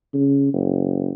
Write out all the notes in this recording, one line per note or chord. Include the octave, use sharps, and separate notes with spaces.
C#3
F#1